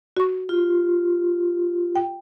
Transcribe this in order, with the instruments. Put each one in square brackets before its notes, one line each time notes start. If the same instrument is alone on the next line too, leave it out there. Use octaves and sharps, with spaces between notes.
[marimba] F#4 C#6
[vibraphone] F4 G4
[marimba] G5